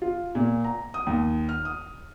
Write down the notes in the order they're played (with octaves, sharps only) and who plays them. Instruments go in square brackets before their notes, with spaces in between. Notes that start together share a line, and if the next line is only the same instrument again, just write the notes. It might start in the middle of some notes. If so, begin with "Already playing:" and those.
[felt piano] F4
A#2
A#5
D#6
D#2
F6
D#6